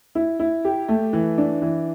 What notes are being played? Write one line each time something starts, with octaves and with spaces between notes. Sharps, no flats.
E4
E4
G4
A3
E3
D4
E3